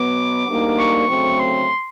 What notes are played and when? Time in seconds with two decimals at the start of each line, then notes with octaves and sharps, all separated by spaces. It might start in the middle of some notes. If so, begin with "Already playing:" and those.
Already playing: B2 F#3 B3 D6
0.48 D2 D3 G3 A#3 D#4
0.79 C#6
1.08 D2 C#3 F#3 A3 C4
1.39 C6